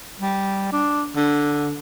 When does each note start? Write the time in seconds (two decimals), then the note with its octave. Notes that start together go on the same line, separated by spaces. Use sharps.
0.21 G3
0.72 D4
1.16 D3